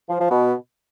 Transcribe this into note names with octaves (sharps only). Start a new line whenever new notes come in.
F3
F3
B2